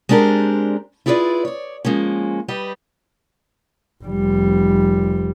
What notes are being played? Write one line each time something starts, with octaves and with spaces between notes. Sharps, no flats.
G#3 C4 D4 G4 A#4
E4 F4 G#4 B4 C#5 D5
C#5 D5
F3 G#3 A#3 C#4
G3 G4 B4 D#5
F1 G3